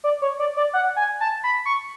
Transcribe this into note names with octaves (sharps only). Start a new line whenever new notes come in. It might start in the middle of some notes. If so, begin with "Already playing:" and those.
D5
C#5
D5
D5
F#5
G#5
A5
B5
C#6